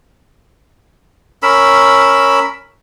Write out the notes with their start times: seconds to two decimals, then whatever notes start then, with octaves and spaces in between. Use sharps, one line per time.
1.43 C#4 A#4 B5 E6